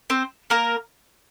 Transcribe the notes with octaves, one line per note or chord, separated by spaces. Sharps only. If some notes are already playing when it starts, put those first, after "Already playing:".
C4 C5
A#3 A#4